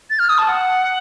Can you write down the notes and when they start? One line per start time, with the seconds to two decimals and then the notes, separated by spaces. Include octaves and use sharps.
0.10 A6
0.19 F6
0.29 D#6
0.38 A5
0.48 F#5